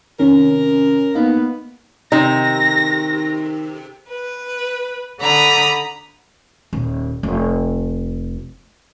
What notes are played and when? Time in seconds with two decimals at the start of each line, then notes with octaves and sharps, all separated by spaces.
0.19 C3 D#3 C#4 A#4
1.15 A#3 B3 D#4 F5
2.12 C3 D#3 D#4 A#6
4.10 B4
5.20 D3 A#5 B5 D#6
6.73 D#1
7.23 F1